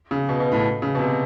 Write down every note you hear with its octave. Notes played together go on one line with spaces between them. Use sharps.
C#3
B2
B2
A2
C#3
B2
C3